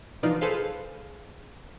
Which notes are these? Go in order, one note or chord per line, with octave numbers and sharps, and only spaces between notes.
B2 E3 F3 D4 D#4 F4
G#4 A4 B4 C5 F5